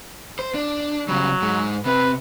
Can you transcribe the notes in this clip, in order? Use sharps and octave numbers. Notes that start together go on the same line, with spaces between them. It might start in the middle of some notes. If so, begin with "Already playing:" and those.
C5
D4
C#3 F#3 G3
G#2 G#3
C3 C4 B4